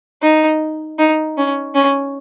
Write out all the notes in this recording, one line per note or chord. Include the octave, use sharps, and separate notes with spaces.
D#4
D#4
C#4
C#4